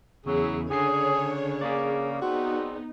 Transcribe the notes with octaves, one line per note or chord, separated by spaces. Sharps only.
E2 C#3 F#3 E4 G#4
D3 D4 G#4 C#5 G#5 C7
A#3 G#4 D5
B3 C4 D#4 F#4